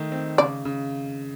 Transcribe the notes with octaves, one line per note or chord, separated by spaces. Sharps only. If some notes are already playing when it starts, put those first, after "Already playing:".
Already playing: D#3 A3
C4
C#3 D5
C#3